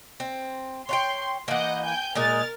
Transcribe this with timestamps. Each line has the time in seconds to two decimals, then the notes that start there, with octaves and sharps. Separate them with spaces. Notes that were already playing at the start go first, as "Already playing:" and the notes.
0.20 C4
0.89 C#5 F#5 G5 C6
1.48 E3 A#3 D#5 F#5 G6
1.83 G5 G#5 G6
2.15 A#2 G#3 G#4 A#4 F6 A6